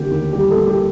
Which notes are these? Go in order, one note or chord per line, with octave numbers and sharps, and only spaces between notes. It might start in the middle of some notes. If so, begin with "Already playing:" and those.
Already playing: D3 A#3 G4
D#2
G3 G4
A4
A#3
G4